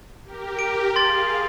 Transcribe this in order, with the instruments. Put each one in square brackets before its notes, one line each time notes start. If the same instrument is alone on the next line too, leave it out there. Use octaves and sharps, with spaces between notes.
[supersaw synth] G4 A#4
[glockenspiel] D7
[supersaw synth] G#4 F5 [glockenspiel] C6 A6